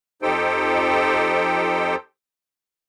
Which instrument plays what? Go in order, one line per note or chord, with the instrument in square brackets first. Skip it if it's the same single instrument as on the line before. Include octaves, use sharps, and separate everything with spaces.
[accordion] F2 D#4 G4 A4 C5 G5